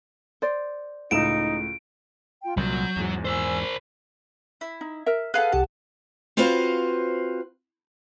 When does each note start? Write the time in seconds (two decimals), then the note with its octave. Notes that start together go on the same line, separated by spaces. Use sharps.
0.42 C5 D5
1.11 C#2 A2 D#4 D7 E7
2.42 F4 G5
2.57 C2 A#2 F#3 G6
2.96 E2 G#2
3.25 A#4 C5 G#5 E6
4.61 E4
4.81 D#4
5.06 A#4 E5
5.34 G#4 A4 B4 F5 F#5
5.52 C2 G4 F#5 A5
6.37 C4 F4 F#4 B4 C5 F5